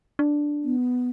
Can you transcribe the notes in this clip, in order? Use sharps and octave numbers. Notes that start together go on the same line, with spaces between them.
D4
B3